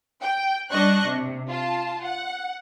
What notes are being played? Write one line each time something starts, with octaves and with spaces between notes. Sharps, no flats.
G5
G3 D4 D#5 C#6 F#6
C3
F4 A5
F#5